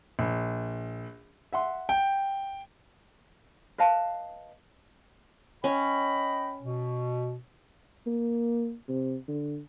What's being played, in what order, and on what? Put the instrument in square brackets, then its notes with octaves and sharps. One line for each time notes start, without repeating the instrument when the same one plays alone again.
[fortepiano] A#1
E5 F#5 C6
[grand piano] G5
[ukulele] B4 D#5 F5 A5
[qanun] C#4 [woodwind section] D#5 G5 B5
[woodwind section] B2
[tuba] A#3
C3
D3